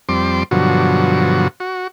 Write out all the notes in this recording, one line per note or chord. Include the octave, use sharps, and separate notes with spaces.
F2 G3 C4 C6 D6
G2 B2 D3 F3 F#3 F#4
F#4